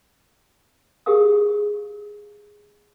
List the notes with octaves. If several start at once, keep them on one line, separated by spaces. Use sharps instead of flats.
G4 G#4 A#4 F5 D#6